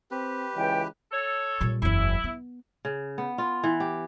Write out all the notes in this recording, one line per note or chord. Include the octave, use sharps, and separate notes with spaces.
C4 G4 B4
C#2 E3 G5
A4 C#5
A#2 G3
F#1 E2 E4
B3
C#3
B3
F4
E3
G4